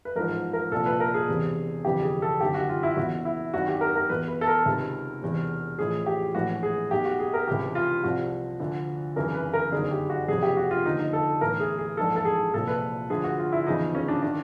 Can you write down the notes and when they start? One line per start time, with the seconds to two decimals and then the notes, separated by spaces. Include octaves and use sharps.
0.05 B4
0.16 A1 G#2 F3 A#4
0.53 A#4
0.71 C2 A#2 F3 A4
0.86 B4
1.00 A#4
1.14 G#4
1.28 E1 E2 C3
1.85 G1 F2 C3 E3 G4
2.03 G#4
2.22 A4
2.41 G1 F#2 D#3 G4
2.54 F#4
2.69 F4
2.83 E4
2.97 F#1 E2 B2 F#4
3.25 E4
3.54 G#1 F#2 D#3 F#4
3.68 G4
3.81 A#4
3.95 A#4
4.09 E2 B2 B4
4.28 B4
4.41 A4
4.47 A#4
4.66 C#2 C3 D#3
5.22 E1 E2 C3
5.79 A1 A2 F3 G#4
6.06 G4
6.35 A#1 A2 E3 F#4
6.63 G#4
6.91 B1 B2 G4
7.05 F#4
7.19 G#4
7.34 A#4
7.48 C#2 C3 E3 G4
7.75 F4
8.03 C2 C3 F3 F#4
8.60 D2 D3 F3
9.16 G#1 F#2 C#3 E3 A#4
9.35 B4
9.54 A#4
9.72 G1 F#2 D#3 G#4
9.91 G4
10.10 F#4
10.28 F#1 F2 C3 G#4
10.43 G4
10.57 F#4
10.71 F4
10.85 D#2 D3 F3 D#4
10.99 D#4
11.13 A4
11.41 B1 A2 E3 A#4
11.60 G#4
11.78 G#4
11.97 A#1 G#2 E3 A4
12.16 A4
12.25 G#4
12.54 C2 A#2 F3 A4
12.68 B4
13.10 D2 D3 F3 G#4
13.24 F#4
13.38 F4
13.52 E4
13.67 E2 C#3 F3 D#4
13.95 C#4
14.08 D4
14.23 D#3 D4